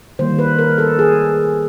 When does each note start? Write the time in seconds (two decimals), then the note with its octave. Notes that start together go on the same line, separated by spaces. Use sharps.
0.19 D#3 G3 A#3 C5
0.39 B4
0.58 A#4
0.78 A4
0.99 G#4